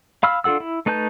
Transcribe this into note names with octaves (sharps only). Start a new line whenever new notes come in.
F5 B5 E6 F6
D4 F4 A4 F#5 E6
E4
A3 D#4 B4 A5 G6